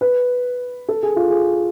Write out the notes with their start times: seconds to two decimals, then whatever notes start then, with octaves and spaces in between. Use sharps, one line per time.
0.01 B4
0.89 A4
1.03 G#4
1.16 F4
1.29 G#4